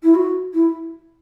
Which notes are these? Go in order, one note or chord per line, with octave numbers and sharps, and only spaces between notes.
E4
F#4
E4